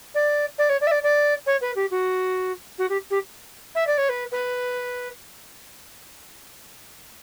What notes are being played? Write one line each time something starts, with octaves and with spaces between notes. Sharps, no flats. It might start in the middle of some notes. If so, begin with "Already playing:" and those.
D5
D5
C#5
D5
E5
D5
D5
C#5
B4
G4
F#4
F#4
G4
G4
E5
D5
C#5
B4
B4